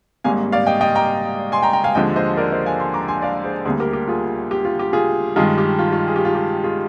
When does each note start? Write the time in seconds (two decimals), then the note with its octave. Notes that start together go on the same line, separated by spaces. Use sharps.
0.24 G#1 G#2 G3 A#3 F5 G#5
0.52 D5 F5
0.67 D#5 G5
0.81 D#5 G5
0.95 G5 A#5
1.52 G#5 C6
1.62 G5 A#5
1.73 G5 A#5
1.84 F5 G#5
1.95 D#2 D3 F3 G#3 D#5 G5
2.16 C5 D#5
2.37 A#4 D5
2.52 C5 D#5
2.66 F5 G#5
2.80 G#5 C6
2.94 A#5 D6
3.08 G#5 C6
3.22 D5 F5
3.44 G#4 C5
3.65 D2 D3 G3 A#3 G#4 C5
3.80 G4 A#4
3.93 G4
4.08 F4 G#4
4.51 G4
4.65 F4
4.79 G4
4.93 F4 G#4
5.36 G2 D#3 G#3 F4 G#4
5.58 G4
5.79 F4
5.92 F4
6.07 G#4
6.16 G4
6.25 F4
6.35 G4
6.64 F4 G#4